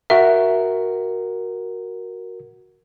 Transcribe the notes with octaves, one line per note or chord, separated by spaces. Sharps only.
F#4 A#4 E5